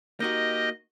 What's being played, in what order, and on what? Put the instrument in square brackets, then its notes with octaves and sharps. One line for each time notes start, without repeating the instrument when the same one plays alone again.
[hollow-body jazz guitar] A#3 D#4 F#4 [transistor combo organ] G4 A#4 [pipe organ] D#5